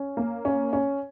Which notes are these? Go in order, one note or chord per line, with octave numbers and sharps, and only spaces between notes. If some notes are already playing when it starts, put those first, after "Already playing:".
Already playing: C#4
A#3
C#4
C#4